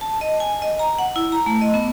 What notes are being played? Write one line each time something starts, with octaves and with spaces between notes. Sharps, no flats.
A5
D#5
G#5
D#5
A#5
F#5
E4
A#5
A3
D#5
B3